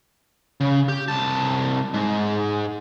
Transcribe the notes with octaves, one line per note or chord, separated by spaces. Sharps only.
C#3
G4
C2 A5
G#2